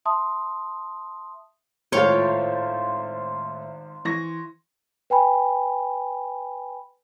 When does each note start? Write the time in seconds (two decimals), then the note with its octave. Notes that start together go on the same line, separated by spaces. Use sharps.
0.05 E5 A5 C6 D#6
1.92 G#1 A2 A3 F4 C5 C#5 F5 G5
4.05 E3 C#6 A#6
5.10 B4 G5 G#5 B5